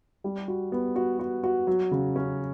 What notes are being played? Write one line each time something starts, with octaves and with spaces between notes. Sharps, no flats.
G3
F#4
B3
F#4
F#4
F#4
F#3
C#3
C#4